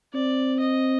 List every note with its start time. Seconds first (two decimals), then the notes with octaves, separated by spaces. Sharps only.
0.14 C4 D5
0.60 D#5